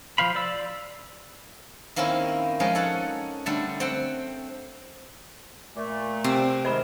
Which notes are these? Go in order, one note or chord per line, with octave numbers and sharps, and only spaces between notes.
F3 C5 F5 B5
D5 E6
D#3 A#3 C4 C#4 E4
F3 G#3 C#4 D#4
A4 C#5 F#5
D3 G3 A3
C4 F#5 G5
A#2 A3
C3 C4
G#2 D#3 G#3 C5 B5 E7